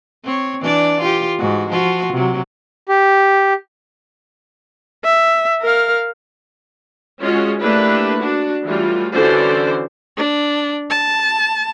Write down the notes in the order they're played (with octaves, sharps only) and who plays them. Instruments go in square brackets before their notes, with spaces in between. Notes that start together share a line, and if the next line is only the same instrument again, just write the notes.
[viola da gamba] C4 C#5
E3 D4 D5
F4 G4
G#2 F#4
F3 F4 F#4
C3 F#3
[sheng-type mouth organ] G4
[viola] E5
A#4 F5
[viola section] G#3 C#4 F4 F#4 C#5 D#5
A3 A#3 D4 E4 G4 B4
D4 F#4
E3 F#3 G3 A3 F4
D3 E3 C#4 F#4 C5 D5
[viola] D4
A5